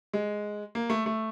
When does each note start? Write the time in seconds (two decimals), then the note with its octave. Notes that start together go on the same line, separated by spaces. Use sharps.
0.13 G#3
0.75 A#3
0.90 A3
1.06 A3